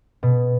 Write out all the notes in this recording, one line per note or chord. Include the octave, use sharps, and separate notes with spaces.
B2